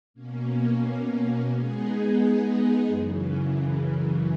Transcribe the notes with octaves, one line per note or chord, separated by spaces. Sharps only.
B2 A#3 C#4
G#3 B3 D#4 G#4
F#2 C#3 E3